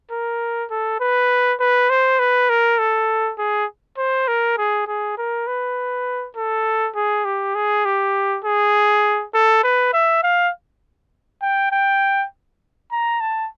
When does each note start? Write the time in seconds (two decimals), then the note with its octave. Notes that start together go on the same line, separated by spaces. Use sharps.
0.11 A#4
0.70 A4
1.00 B4
1.60 B4
1.90 C5
2.19 B4
2.49 A#4
2.79 A4
3.38 G#4
3.98 C5
4.28 A#4
4.58 G#4
4.87 G#4
5.17 A#4
5.47 B4
6.36 A4
6.95 G#4
7.25 G4
7.55 G#4
7.85 G4
8.44 G#4
9.34 A4
9.64 B4
9.93 E5
10.23 F5
11.42 G5
11.71 G5
12.91 A#5
13.20 A5